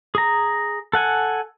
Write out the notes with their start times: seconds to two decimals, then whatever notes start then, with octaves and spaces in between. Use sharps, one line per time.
0.15 G#4 A#5
0.93 A4 F#5 G#5